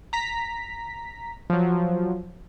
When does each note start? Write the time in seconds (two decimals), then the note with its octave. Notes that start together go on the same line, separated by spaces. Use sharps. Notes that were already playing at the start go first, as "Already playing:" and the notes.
0.13 A#5 B6
1.50 F3 F#3